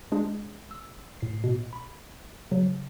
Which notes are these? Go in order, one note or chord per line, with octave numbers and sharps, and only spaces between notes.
G#3 D4 G#4
E6
A2 C7
B2
B5
C#3 F#3